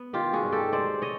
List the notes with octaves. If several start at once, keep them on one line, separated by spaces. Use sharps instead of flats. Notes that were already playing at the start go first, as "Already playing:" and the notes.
Already playing: B3
D#3 F4 G4
F#4 G#4
G2
G4 A4
G#3 C5 D5
C#5 D#5